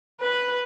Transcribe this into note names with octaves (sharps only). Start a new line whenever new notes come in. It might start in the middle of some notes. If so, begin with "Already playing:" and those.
B4